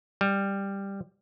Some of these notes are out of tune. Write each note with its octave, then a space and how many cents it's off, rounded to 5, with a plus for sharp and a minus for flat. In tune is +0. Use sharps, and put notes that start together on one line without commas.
G3 +10